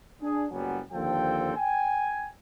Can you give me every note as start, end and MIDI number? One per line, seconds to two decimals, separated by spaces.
0.21 0.44 62
0.21 0.44 68
0.51 0.80 30
0.51 0.80 37
0.51 0.80 54
0.51 0.80 55
0.51 0.80 59
0.51 0.80 80
0.92 1.55 39
0.92 1.55 50
0.92 1.55 53
0.92 1.55 60
0.92 1.55 69
0.92 1.55 79
1.56 2.26 79
1.56 2.26 80